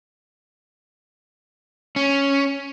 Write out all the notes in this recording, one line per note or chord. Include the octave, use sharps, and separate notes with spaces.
C#4